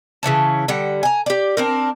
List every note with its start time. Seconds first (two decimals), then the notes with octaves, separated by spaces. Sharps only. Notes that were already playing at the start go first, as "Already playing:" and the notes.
0.23 C#3 E3 C#5 A5
0.68 D3 G3 F#5 G5
1.03 G#5 A#5
1.26 G4 D5
1.57 C4 D4 A#4